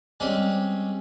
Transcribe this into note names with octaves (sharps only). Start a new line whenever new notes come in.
G3 G#3 C4 C#4 G4